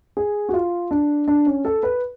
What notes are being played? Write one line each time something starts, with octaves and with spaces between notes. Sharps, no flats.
G#4
F#4
F4
D4
D4
C#4
A4
B4